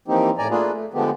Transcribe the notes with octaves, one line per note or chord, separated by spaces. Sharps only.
E3 F3 A#3 C4 D#4 G4
A2 D5 G#5 A#5
A3 A#3 D4 F4 G#4 B4
A3
D3 F3 G#3 A3 B3 G4